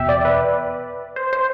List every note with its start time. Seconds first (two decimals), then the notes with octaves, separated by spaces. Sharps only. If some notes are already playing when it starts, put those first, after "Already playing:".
Already playing: E2 B2 E5 G5
0.09 D5
0.25 B4
1.16 C5
1.33 C5